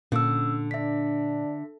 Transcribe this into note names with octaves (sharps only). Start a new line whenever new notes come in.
A#2 D3 C#4 E6
D4 E5 B6